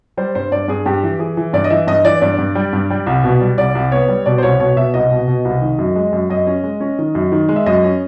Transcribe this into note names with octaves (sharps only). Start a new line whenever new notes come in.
G3 C5
G2 C5
G2 D5
G2 G#4
G2 G4
E3
E3 G#4
E3
G2 D5
D#5
E3 E5
G2 D#5
E3 D5
G2 D5
G2
G3
G2
G3
C2
B2
G3
C2 D5
C2
B3 C#5
G3
B2 D5
C5
C2 C#5
B2 C#5
B2 E5
C2 D#5
B2
B2
C2
D#3
F#2
G#3
F#2
F#2 D#5
C#4
G#3
C#4
D#3
F#2
D#3
G#3
E5
F#2 D#5
C#4